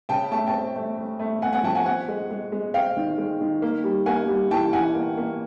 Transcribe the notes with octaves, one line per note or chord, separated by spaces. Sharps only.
C#3 G5 A5
A3 A5
G5 A5
C4
A3
A3
A3
A3 F#5 G#5
F#5 G#5
F3 G5 A5
F#5 G#5
C4 F#5 G#5
G#3
G#3
G#3
C4 F5 G5
D#3
G#3
D#3
A#3
G3
A#3 F#5 G#5
G3
E3 G5 A5
E3 F#5 G#5
A#3
A#3